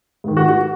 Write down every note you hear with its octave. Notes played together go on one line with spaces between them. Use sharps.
G#2 D#3
F#4
F#4